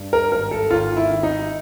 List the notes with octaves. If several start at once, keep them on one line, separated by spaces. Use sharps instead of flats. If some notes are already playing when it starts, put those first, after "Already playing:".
Already playing: G2
A#4
G#1 A#4
A4
G#1 F4
E4
D#3
D#4